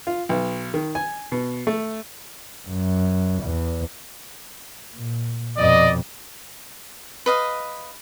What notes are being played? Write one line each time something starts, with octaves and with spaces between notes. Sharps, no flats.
F4
B1
D#3
G#5
B2
A3
F#2
E2
A#2
F2 B2 D5 D#5
B4 D#5 F5